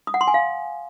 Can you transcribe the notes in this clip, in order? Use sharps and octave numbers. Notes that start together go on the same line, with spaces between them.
D#6
F#5
C6
G#5
F5